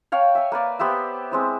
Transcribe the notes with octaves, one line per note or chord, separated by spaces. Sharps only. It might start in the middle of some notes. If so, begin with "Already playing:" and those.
C#5 F5 G5 A5
E5 G#5
A#3 B4 D5
B3 G4 C5 E5
G#3 C4 E4